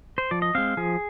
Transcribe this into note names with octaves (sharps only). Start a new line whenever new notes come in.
C5
F3 D5
D#5
G#3 C4 F5
F3 G#4